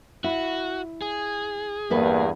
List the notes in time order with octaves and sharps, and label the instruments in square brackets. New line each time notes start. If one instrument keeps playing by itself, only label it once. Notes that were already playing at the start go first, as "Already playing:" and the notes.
[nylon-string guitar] E4 [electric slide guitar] F#4
[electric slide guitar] G#4
[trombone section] E2 G2 [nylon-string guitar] A3 A#3 B4